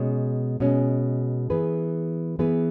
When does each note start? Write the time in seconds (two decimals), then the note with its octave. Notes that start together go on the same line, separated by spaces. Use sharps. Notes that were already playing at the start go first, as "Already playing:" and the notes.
Already playing: B2 G#3 C#4
0.60 B2 G#3 C#4
1.50 E3 B3 G#4 B4
2.39 E3 B3 G#4 B4